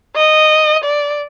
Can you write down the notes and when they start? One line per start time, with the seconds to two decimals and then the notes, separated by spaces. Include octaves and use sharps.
0.16 D#5
0.84 D5